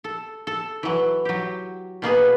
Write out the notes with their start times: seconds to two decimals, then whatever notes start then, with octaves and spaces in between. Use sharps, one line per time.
0.04 A4
0.47 A4
0.83 E3 F#3
1.25 F#3 G4
2.02 B2 A#3 B3 G#4